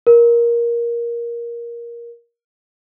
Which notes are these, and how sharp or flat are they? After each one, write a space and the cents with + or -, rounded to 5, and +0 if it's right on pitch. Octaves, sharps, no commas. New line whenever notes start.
A#4 +15